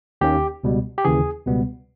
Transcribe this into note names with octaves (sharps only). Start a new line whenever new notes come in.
D#2 D#3 A#3 C#4 G4
C#2 B2 G3
G4
D#2 C#3 E3 G#4
C#2 B2 G3 B3